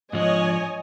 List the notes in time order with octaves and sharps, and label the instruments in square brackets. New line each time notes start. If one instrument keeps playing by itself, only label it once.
[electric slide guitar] G#2 F3 D4 [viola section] C#5 D#5 G#5